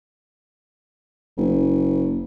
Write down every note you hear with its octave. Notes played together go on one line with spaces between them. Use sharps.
F#1